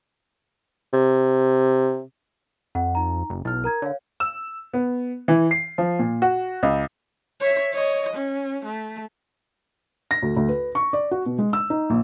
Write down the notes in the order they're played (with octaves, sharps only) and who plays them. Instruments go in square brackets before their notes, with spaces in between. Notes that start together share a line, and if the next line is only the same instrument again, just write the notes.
[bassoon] C3
[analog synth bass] F2 [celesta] F#5
[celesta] D#4 A#5
[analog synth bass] F#1
[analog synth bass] B1 [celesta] E4 F6
[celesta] A#4 A#5 G#6
[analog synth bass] D3 [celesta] C#5 F5
[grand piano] E6
B3
E3
C7
F3
A#2
F#4
C#2
[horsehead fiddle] C#5 E5
C#5 D#5
C#4
A3
[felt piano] A#6
D2
D2
B4
C#6
D5
F#4
B2
G#3
E6
D#4
A#1